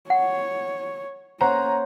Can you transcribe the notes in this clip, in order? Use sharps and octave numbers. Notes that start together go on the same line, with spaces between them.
C#5 F#5
A#3 C#4 C5 C#5 F#5 A#5